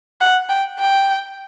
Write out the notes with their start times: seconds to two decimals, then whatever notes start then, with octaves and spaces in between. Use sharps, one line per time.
0.21 F#5
0.49 G5
0.79 G5